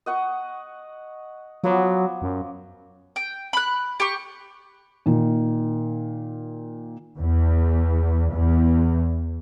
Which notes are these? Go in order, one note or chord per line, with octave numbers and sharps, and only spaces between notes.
D#5 F#5 C#6
F3 F#3 B3 D6
F#2
G5
B5 F#6
G4 C#6
A#2 D#3
E2
E2